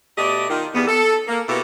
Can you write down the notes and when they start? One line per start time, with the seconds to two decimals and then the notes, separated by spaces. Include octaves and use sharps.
0.17 B2 A3 G4 D5 D#5
0.49 D#3 F4
0.75 E2 G3 B3
0.87 A4
1.27 A#3
1.48 B2 A#3 E4 G4 A4 B4